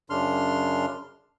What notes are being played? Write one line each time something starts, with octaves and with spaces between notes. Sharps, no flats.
F#2 C#3 D4 C6 F6